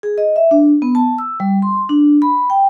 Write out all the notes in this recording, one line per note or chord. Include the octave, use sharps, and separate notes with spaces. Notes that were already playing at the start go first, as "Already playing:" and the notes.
G#4
D#5
E5
D4
B3
A5
E6
G3
C6
D4
B5
G5